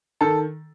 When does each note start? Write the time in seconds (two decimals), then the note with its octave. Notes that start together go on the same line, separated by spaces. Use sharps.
0.21 D#3 A4